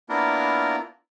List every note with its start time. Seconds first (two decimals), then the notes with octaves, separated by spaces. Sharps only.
0.09 A#3 B3 D4 E4 F4 A#4